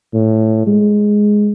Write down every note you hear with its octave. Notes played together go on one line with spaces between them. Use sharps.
A2
G#3